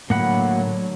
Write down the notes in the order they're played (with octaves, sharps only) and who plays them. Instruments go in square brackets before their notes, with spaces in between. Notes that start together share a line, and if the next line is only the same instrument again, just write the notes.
[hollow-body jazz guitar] A2 [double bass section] D3 F#3 [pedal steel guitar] A#3 F#5 B5